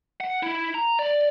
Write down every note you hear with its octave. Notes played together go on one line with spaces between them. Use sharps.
F#5
E4
A#5
D5